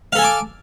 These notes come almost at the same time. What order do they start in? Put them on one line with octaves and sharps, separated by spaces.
F5 A4 G#5 A5 D6